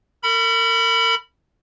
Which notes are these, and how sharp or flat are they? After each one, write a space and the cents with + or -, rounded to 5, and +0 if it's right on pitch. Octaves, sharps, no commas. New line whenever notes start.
A#4 -40 B5 +0